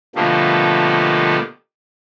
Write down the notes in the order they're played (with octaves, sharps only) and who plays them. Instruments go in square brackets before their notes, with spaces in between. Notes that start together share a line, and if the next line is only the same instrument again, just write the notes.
[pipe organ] B2 D3 F3 G3 A3 A#3